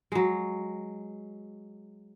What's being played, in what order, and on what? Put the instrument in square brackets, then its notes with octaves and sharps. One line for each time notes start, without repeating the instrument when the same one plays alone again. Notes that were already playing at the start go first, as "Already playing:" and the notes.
[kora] F#3 G#3